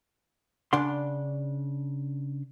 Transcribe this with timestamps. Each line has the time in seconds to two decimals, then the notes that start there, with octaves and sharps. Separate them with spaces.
0.73 C#3 D4 D5 F#5 C6